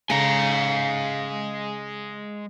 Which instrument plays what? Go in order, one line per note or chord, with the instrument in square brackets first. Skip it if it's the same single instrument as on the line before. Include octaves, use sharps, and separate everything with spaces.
[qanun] C#3 A4 [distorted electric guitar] G#3 A#5 [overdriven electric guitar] F5 G#5